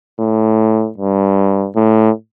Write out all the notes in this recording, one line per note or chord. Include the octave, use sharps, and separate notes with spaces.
A2
G2
A2